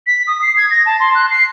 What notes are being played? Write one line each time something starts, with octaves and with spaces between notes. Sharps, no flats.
B6
D#6
C7
G#6
A#6
A5
C6
F#6
C7